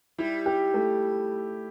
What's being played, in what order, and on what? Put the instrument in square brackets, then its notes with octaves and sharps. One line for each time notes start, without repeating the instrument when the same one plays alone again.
[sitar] G3 [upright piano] E4
[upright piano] G4
A3